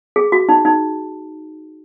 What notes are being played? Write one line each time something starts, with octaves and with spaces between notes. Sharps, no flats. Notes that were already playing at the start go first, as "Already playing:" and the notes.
G#4
F#4
D#4
D#4